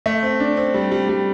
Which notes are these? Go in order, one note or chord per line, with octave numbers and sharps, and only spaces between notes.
A3
C4
D4
C4
G3
G3
G3